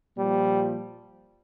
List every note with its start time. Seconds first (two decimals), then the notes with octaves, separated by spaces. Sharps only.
0.14 A#2 F3 G3